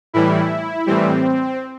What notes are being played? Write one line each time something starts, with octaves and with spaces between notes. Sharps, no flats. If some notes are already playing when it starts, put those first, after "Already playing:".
A2 E3 G3 E4
A2 E3 G3 C4